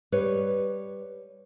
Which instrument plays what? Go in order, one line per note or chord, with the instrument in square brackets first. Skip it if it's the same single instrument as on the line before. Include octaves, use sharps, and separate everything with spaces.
[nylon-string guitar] G3 B4 C#5